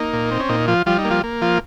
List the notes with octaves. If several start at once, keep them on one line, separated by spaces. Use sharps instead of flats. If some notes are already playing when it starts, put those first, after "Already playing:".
Already playing: A#3 D#4
A#2
C4
C#4
A#2 D#4
F3 F4
F3 G3 F4
D#4
A#3
F3 F4
A#3
F3 F4